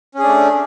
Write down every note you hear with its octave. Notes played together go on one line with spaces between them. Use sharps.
A3 C#4 D4 G#4